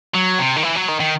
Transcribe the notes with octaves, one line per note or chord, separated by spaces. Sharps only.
F#3
C3
D#3
E3
F#3
D#3
D#3